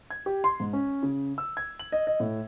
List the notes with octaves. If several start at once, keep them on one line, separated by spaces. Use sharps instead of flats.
G#6
G4
C6
G#2
C#4
C#3
E6
G#6
F#7
D#5
D#5
A2